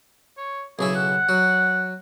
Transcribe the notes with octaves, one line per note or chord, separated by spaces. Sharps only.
C#5
B1 C#3 E4 G#4
F#5
F#3